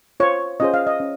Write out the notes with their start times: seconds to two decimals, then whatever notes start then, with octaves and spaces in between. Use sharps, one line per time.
0.20 F4 C5 C#5
0.60 C#4 F4 G#4 C5 D#5
0.74 F5
0.87 D#5
1.00 C#4